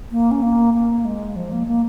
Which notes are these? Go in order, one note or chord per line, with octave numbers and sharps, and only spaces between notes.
A#3
C#4
A#3
A#3
G#3
F3
A#3
A#3